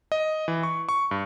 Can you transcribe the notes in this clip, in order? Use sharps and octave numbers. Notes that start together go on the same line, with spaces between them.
D#5
E3
C#6
C#6
G2